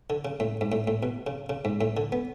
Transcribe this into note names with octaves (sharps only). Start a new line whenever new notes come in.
D3
C#3
A2
G#2
A2
A2
B2
C#3
C#3
G#2
A2
D3
B3